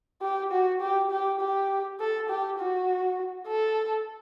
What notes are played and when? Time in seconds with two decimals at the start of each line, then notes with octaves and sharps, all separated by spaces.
0.22 G4
0.52 F#4
0.81 G4
1.11 G4
1.41 G4
2.00 A4
2.29 G4
2.59 F#4
3.47 A4